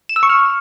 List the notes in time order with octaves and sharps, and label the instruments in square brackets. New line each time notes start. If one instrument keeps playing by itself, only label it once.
[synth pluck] E7
E6
C#6
F6